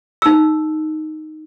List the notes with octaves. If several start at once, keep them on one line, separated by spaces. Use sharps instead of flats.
D#4 E6